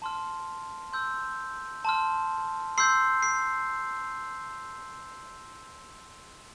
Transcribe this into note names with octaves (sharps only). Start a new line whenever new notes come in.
A5 C6 F6
C6 E6 G6
A5 C6 F6
C6 E6 G6 C7
C7